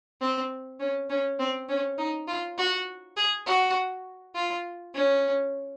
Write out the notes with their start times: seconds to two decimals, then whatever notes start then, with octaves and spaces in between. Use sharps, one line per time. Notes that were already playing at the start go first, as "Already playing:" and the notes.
0.21 C4
0.80 C#4
1.10 C#4
1.39 C4
1.69 C#4
1.98 D#4
2.27 F4
2.58 F#4
3.17 G#4
3.46 F#4
4.35 F4
4.95 C#4